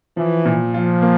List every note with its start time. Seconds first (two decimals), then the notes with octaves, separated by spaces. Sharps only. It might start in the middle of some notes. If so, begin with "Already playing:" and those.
0.17 E3 F3
0.46 A#2
0.74 F3 F4
1.02 A#3